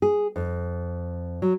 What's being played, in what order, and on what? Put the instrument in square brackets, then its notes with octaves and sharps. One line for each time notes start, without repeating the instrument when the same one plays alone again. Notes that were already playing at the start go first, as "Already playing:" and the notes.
[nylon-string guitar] G#4
F2
F#3